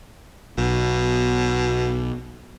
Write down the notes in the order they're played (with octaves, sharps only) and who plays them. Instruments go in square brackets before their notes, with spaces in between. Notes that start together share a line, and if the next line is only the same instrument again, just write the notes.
[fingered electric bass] B1 [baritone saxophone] B2